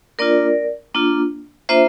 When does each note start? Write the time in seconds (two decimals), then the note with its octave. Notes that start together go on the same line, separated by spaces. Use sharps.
0.19 A#3 D4 F4 A#4 D5
0.94 A#3 D4 F4
1.69 A#3 D4 F4 C5 E5